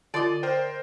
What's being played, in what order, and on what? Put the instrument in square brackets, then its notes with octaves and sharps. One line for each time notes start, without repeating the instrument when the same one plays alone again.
[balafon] D3 F4 D6 [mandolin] D5 D#5
[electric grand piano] A#4 C5 G5